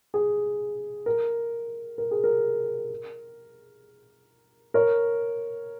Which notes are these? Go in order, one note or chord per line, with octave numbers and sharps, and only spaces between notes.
G#4
A#4
A#4
G#4
A#4
A#4 C#5